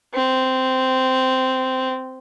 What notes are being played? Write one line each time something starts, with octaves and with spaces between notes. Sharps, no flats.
C4